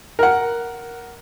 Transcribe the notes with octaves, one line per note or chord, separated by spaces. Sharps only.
A#4 F#5